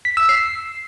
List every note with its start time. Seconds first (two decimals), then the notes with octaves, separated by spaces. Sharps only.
0.05 B6
0.17 E6
0.29 C7